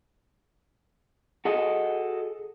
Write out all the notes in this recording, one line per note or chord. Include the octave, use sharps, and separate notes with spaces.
F#4 G#4 A4 D#5